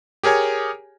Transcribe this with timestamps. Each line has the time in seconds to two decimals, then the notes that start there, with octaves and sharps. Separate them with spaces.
0.23 G4 G#4 A#4 C#5 G#5